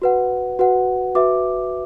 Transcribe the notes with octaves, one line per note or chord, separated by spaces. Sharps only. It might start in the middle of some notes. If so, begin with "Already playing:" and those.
F#4 B4 F#5
F#4 B4 F#5
F#4 B4 E5 D6